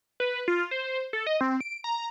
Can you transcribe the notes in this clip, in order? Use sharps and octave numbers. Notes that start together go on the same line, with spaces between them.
B4
F4
C5
A4
D#5
C4
D7
A#5